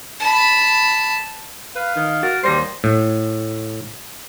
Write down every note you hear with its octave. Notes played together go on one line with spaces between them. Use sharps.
A5 B5
B4 F5
D#3
F#4 A#4 A6
D#2 G3 C5 C6 A#6 C7
A2